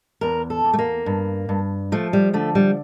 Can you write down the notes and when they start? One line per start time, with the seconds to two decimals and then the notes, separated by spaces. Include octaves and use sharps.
0.21 E2 A#4
0.50 A4
0.64 E2
0.73 A3
0.79 A#3
1.06 G2
1.49 G2
1.92 F3 A3
2.13 G3
2.34 D3 A3
2.55 G3